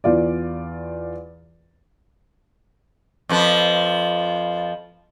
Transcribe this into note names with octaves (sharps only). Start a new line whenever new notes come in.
E2 F4 D5
F2 F3 B4